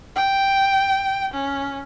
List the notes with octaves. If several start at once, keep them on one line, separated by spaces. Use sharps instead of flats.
G5
C#4